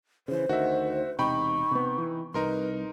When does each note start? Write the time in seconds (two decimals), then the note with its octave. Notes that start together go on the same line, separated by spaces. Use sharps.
0.28 C#3 E3 C5
0.49 D2 D#3 F#4 E5
1.19 E1 C3 D#4 G5 B5 C#6
1.71 C3 B3
1.98 E3
2.34 C2 D#4 A#4 B4 C6